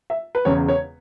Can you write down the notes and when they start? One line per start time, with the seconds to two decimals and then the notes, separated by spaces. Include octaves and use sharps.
0.10 E5
0.35 B4
0.45 E1 E2 C#3 C#5
0.68 C#5